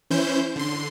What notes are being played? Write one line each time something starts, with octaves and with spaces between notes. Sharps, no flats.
E3 C#4 E4 C5 G6
D3 C6